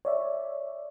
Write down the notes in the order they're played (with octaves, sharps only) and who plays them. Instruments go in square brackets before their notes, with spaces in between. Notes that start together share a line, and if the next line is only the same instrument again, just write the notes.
[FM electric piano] C#5 D5 E5